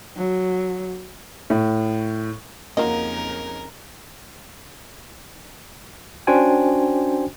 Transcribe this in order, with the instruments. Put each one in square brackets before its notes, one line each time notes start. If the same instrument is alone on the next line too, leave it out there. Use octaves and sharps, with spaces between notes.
[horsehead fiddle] F#3
[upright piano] A2
[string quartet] F2 C#3 D#4 [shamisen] F#3 F4 D#5 [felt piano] A#3 [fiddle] A#4
[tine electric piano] C#4 D4 F#4 C5 G5 G#5